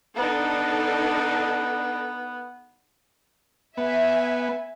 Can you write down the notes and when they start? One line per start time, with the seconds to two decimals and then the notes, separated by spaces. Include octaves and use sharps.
0.16 B3 D4 D#4 A4
3.77 B3 E5 G#5